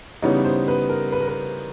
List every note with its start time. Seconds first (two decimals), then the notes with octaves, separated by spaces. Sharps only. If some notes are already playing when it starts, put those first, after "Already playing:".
0.22 C#3 E3 G3 B3 D#4 C#5
0.45 C5
0.68 B4
0.89 A#4
1.12 B4
1.21 A#4
1.28 B4